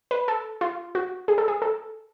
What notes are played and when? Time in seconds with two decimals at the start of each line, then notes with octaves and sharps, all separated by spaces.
0.11 B4
0.28 A4
0.61 F4
0.95 F#4
1.28 G#4
1.38 A4
1.48 G#4
1.62 A4